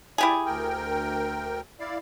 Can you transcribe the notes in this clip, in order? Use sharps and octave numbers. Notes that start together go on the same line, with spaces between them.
E4 G4 G#4 D5
D2 A#4 G5
E4 D5 F5